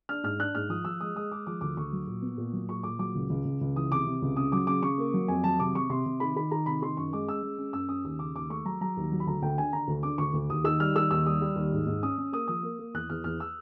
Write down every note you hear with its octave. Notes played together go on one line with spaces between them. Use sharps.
D4 F6
G#2 F6
D4 F#6
G#2 F6
F3 D#6
F3 E6
G#3 D#6
G#3 D#6
G#3 D6
F3 D6
D2 D6
D2 C#6
F#3
A#2
B3
A#2
F#3
A#2 C#6
A#2 D6
F#3 D6
C#2
C#2
C#2
C#2
E3 D#6
C3 D6
C3
C#2
C#3 D#6
F#3 D6
C#3 D6
C#3 C#6
A#3
F#3
F2 G#5
F#3 A5
C3 D6
C3 C#6
C3 C6
C3
D#3 B5
D#3 B5
D#3 A#5
C3 B5
D#3 C6
F#2 C#6
G#3 D6
C#4 E6
G#3
C#4
F#2 E6
C#4 D#6
D#2 D#6
C#3 D6
D#2 D6
A3 C#6
F#3 A#5
F#3 A#5
D#2
F#3
B5
D2 A#5
D2 G5
D3 G#5
D3 A#5
D2
D3 D6
D2 C#6
D2
D#2 D#6
D#3 E6
G3 F6
D#3 E6
D#2 E6
G3 D#6
G3
D#2
G#2
G#2
C#4 D#6
C#4
A#3 D#6
F3 D#6
A#3
A#3
E2 F#6
E2 F6
E2 F6
E6